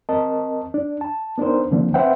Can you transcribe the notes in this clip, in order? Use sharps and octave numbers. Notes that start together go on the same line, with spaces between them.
C4 A#4 D#5 A5
D4
A5
B3 D4 D#4 A#4 C5
D3 F3 A#3 C4 D4
C4 B4 C5 E5 F#5 G5